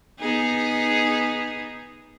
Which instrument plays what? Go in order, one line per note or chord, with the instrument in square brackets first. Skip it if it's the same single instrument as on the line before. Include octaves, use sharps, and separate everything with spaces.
[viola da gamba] B3 D#4 G#4